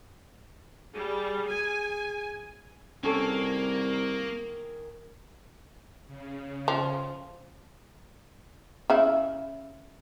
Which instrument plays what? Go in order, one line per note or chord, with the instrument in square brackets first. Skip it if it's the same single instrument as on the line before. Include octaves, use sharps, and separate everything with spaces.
[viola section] G3 [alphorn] G#4
[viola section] G#5
[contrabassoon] C2 [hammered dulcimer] D#3 G#4 C#6 [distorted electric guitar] A#3 [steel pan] C#4 A4
[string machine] C#3
[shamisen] F3
C#3 E4